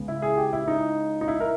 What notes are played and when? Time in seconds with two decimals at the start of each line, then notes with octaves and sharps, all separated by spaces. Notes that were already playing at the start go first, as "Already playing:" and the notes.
Already playing: C#2 C#3 G#3 B3
0.08 E4
0.22 G#4
0.37 G4
0.53 E4
0.68 D#4
1.21 D#4
1.28 E4
1.40 A#4